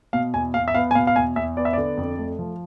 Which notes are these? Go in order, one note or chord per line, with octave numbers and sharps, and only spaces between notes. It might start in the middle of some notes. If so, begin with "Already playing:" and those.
B2 F5
E2 G#5
E2 F5
E5
B3 F5
G#5
B2 F5
F5
E2 G#5
E2 E5
B3 D5
E5
D3 D5
F2
A3
F3